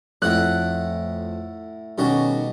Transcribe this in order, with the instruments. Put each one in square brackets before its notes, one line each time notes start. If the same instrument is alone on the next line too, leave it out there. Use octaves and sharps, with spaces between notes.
[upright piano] F2 A3 [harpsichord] A2 E4 F#5 [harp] F#6
[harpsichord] B2 G3 F#4 [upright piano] D#3 C#4 A4